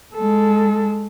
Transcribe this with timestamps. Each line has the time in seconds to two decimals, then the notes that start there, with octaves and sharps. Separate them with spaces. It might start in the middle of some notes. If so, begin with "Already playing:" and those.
0.14 G#3 A4